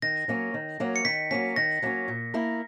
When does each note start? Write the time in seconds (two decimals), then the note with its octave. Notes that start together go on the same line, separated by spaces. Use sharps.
0.02 D#3 A#6
0.28 F#3 A#3 C#4
0.54 D#3
0.80 F#3 A#3 C#4
0.96 C#7
1.05 D#3 B6
1.31 F#3 A#3 C#4 B6
1.56 D#3 A#6
1.82 F#3 A#3 C#4
2.08 A#2
2.34 A#3 E4 A#4